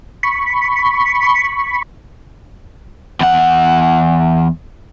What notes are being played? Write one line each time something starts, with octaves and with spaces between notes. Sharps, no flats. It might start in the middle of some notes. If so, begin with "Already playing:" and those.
B5 C#6
E2 F#5